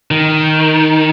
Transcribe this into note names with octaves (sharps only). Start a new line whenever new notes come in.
D#3